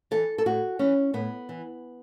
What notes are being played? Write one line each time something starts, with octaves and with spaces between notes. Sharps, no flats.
E3 A4
A4
A2 F#4
E3 C#4
A2 B3
E3